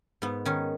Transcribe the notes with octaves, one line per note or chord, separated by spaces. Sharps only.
G#2 B3
D#3 C#4